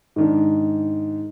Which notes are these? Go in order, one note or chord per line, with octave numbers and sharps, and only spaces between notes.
G#2 D#3 D4